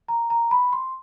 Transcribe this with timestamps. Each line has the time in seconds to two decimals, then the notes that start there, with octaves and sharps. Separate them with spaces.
0.08 A#5
0.30 A#5
0.51 B5
0.73 C6